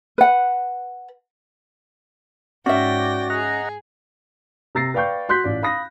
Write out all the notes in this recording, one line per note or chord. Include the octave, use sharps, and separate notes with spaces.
B4 F#5
G#2 C#4 F#4 D5 E5 G5 A#6
G#4 D#5 F#5 A#5
C3 A#5 E6 A6 A#6 C7
B4 D5 F5 G5 C#6 G6
F#4 C6 F#6 G6 B6
A1 F4 D5
F5 B5 D#6 A#6